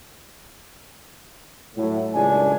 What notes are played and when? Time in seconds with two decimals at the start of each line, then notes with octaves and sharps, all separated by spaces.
1.76 A2 F#3
2.14 F#1 C#2 A2 G3 D4 G#5